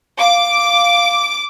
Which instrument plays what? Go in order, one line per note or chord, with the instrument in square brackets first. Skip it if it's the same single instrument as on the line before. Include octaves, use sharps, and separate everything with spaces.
[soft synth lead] F5 [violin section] D6